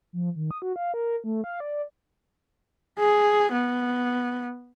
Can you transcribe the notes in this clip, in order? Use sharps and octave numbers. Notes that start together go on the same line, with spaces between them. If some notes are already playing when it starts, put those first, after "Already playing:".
F3
D#3
D#6
F#4
F5
A#4
A3
F5
D5
G#4
B3